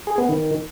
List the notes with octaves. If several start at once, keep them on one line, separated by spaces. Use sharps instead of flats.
G#4
B3
D#3